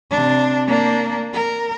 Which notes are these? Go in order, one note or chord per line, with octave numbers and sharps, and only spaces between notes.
C3 D4
A#3 D4
A#4